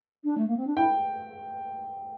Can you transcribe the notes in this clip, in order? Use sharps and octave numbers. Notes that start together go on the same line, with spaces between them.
D4
A3
A#3
C4
D4
E4 G5